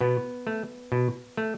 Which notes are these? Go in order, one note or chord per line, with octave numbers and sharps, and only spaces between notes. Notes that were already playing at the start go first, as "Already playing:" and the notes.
B2 B3
A3
B2
A3